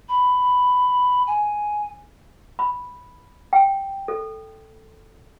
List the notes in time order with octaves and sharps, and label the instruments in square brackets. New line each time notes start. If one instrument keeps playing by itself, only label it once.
[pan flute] B5
G#5
[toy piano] B5
G5
A4